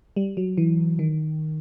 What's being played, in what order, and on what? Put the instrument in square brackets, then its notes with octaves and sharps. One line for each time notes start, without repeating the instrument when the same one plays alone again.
[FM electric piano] G3
F#3
E3
D#3